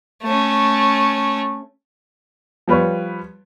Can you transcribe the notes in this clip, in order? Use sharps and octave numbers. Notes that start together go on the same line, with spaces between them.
A3 C#4
F3 G3 B4 C#5